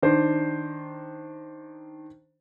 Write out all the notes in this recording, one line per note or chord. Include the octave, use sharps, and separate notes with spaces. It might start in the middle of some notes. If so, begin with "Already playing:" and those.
D#3 D4 C5